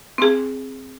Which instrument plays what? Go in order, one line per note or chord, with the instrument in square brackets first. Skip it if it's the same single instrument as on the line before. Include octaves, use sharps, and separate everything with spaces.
[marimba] C4 G#4